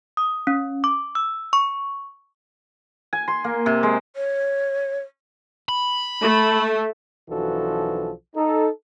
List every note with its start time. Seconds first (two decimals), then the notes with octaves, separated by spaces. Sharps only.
0.17 D#6
0.47 C#4
0.84 D6
1.15 E6
1.53 C#6
3.13 G#5
3.28 C6
3.44 A#3
3.66 C3
3.83 G#3
4.16 C#5
5.69 B5
6.21 A3
7.29 B1 E3 F3 D4 F#4 A4
8.35 D#4 A4